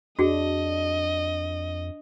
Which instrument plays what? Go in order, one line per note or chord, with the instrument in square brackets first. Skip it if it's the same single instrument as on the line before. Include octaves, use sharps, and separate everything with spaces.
[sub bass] F2 [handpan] D4 [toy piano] F#4 G#4 [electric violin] D#5